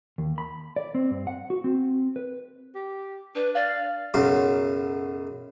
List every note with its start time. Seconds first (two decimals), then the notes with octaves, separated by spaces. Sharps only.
0.18 D#2
0.38 B5
0.76 D5
0.95 C4
1.11 G2
1.27 F#5
1.50 F#4
1.64 C4
2.16 B4
2.75 G4
3.35 D4 B4
3.55 D5 F5
4.14 B1 F#2 C#3 F#3 F5 C6